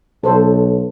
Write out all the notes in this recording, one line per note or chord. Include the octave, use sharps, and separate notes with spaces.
B1 A4 C5